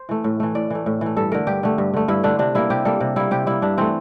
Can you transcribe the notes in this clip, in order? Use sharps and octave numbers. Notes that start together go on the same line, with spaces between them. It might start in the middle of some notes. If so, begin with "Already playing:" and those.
Already playing: C5
E3 A3
A2
E3 A3
A2 D5
E3 A3
A2
E3 A3
G2 A4
D3 A3 A#4
G2 G4
D3 A3
G2
D3 A3
G2 E4
D3 A3 D4
C3 D4
G3 A#3 E4
C3 G4
G3 A#3 A4
C3
G3 A#3 E4
C3 G4
G3 A#3 E4
G2 D4
E3 A3 C4